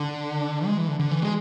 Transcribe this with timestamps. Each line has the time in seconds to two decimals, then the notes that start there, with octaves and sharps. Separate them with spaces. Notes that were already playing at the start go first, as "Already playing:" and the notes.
Already playing: D3
0.66 G#3
0.78 E3
0.88 D3
1.00 D3
1.11 E3
1.22 G#3